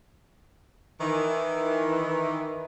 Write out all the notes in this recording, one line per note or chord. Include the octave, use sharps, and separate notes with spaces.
D#3 E3